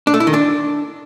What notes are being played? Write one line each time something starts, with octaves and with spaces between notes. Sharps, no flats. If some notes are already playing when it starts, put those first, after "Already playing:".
D4
A3
E4
D#3
D4